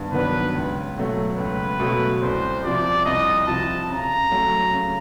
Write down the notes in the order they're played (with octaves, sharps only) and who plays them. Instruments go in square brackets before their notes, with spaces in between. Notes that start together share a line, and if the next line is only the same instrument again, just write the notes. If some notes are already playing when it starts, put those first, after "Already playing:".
Already playing: [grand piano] G2 D#3 B3
[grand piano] D#3 F#3 B3 D4 [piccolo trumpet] B4
[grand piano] C#2
B2 F#3 A3
[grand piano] C#2 [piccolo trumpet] B4
[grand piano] B2 F#3 A3
[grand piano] C2 [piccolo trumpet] C5
[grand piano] C3 F3 [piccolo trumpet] D5
[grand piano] C2 [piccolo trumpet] D#5
[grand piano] C3 F3 [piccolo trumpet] A5
[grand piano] C#3 [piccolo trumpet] A#5
[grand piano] F#3 A3 C#4
C#3